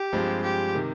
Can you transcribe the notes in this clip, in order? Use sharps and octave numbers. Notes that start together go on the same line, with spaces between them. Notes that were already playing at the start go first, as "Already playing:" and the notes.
Already playing: G4
G2 F3 G#3 C4
G4
C3 D#3